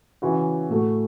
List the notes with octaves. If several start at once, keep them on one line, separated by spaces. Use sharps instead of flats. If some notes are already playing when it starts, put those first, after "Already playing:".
C#3 E3 C#4 F#4
A2 A3 F#4